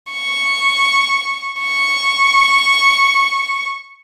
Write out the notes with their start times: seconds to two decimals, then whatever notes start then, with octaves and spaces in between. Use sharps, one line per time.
0.11 C#6
1.62 C#6